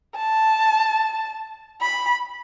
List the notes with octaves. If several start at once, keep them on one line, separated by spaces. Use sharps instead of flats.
A5
B5